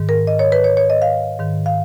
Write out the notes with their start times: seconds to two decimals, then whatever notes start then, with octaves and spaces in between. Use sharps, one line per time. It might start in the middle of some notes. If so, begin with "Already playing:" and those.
Already playing: G#2 D#3
0.09 A#4
0.27 D#5
0.39 C#5
0.52 B4
0.64 C#5
0.77 C#5
0.90 D#5
1.02 F5
1.39 G#2 D#3
1.66 F5